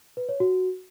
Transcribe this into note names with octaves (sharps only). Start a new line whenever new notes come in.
B4
C#5
F#4